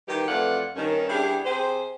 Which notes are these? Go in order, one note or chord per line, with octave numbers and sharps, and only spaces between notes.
D#3 E3 G3 G4
F2 E3 A3 F4 D5 F#5
G2 D#3 C#4
E2 G3 D4 E4 G4 G#4
C3 G4 G#4 C5